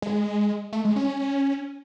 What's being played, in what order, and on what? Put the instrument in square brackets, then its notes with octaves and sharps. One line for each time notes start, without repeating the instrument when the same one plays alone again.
[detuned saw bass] G#3
A3
G#3
C#4